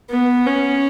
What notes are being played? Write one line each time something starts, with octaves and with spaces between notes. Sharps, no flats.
B3
C#4